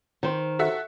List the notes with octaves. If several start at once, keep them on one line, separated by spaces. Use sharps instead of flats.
D#3 C5
F#4 A4 E5